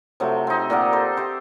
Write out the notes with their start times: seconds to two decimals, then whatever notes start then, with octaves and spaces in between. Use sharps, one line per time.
0.20 C3 F3 F#3 A3
0.47 C4 D#4
0.70 A#2 G4 A#4 F#5
0.93 A4 C5
1.17 G4 C5 E5